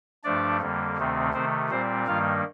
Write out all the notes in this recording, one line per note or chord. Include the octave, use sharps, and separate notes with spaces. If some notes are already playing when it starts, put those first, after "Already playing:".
G2 F3 A3 D4 D5
F2 D3 G3 A#3
D2 C3 D#3 A3 C4
C3 D#3 A3 C4 C5
A#2 G3 C4 C5
G2 D#3 G3 A#3 F4 F5